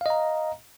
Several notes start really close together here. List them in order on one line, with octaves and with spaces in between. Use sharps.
F5 D#5 A#5